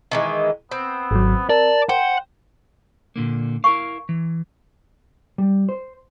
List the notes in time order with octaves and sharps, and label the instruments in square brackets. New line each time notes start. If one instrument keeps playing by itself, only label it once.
[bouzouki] D#3 E3 G#3
[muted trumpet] B3 [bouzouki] C4
[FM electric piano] G#1 F#3
[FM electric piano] A#4 [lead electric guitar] D5 [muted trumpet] A5
[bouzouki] C5 [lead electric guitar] F#5 [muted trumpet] G5
[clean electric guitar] A#2 D3 A#3
[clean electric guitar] E4 A#4 F5 [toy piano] C#6
[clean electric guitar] E3
[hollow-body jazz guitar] G3
C5